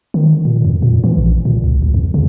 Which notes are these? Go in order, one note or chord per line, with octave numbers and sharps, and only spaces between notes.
D#3
A#2
F2
A#2
E3
A#1
A#2
C#2
D2
F2
C#3